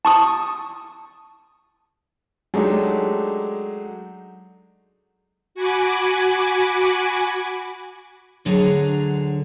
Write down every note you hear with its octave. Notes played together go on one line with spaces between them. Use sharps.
A5 C#6 D#6
F#3 G#3 A3 D4 D#4 G4
F#4 G#5 B5 D6
D2 D3 F#3 G#4 E5 A#5